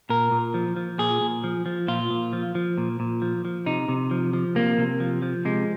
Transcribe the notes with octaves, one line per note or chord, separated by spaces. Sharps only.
A#2 A#4
A#2
F3
F3
A#2 G#4
A#2
F3
F3
A#2 F4
A#2
F3
F3
A#2
A#2
F3
F3
C3 D#4
C3
F3
F3
C3 A#3
C3
F3
F3
C3 G#3